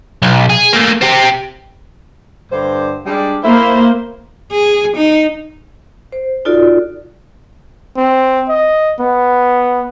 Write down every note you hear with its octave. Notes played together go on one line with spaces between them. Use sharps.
B1
G#4
A3 A#3
C4 G4
G2 D3 C5
G3 G#3 D4
A#3 E4 C5 E5
G#4
D#4
C5
D#4 F4 F#4 A4 D5
C4
D#5
B3